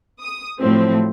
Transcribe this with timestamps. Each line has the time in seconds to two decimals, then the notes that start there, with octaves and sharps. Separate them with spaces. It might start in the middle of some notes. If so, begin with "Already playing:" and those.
0.22 D#6
0.59 A2 F3 F#3 A3 C4